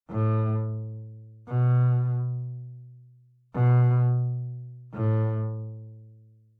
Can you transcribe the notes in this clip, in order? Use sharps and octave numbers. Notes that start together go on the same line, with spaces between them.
A2
B2
B2
A2